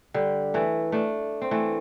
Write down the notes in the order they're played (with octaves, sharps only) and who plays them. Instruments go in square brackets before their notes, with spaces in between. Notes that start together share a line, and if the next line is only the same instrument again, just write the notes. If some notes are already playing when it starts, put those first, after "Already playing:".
[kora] D3 G3
E3 A3
A3 D4
C4
E3 A3